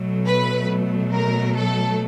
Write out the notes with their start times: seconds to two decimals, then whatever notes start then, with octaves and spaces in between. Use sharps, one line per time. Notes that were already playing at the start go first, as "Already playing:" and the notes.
Already playing: B2 F#3 A3
0.26 B4
1.13 A#4
1.55 A4